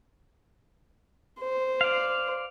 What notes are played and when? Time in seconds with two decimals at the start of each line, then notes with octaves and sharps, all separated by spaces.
1.40 C5
1.81 D5 F5